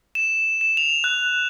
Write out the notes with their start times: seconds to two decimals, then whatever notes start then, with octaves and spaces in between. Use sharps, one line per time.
0.15 E7
0.61 E7
0.77 F7
1.04 F#6